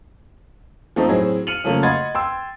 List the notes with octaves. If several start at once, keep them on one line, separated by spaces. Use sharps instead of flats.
F3 A3 C4 D#4
A2 F#3 C4 E4 G#4
F6 C#7 D#7 F7 F#7
C#3 F3 F#3 A3 A#3
D#5 F#5 B5 C6 G#6 A6
G5 C6 E6